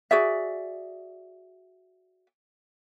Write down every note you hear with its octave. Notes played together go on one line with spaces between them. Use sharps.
F#4 G#4 D5 E5